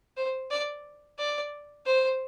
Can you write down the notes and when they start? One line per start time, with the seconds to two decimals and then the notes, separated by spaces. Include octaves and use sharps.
0.17 C5
0.51 D5
1.19 D5
1.86 C5